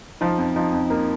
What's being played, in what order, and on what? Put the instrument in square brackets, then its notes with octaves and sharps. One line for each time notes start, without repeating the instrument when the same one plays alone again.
[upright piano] F3 [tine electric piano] D#4
[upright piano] F2
[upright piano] F3 [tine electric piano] D#4
[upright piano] F2
[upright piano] A#3 [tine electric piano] D#4